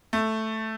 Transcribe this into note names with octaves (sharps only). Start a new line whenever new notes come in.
A3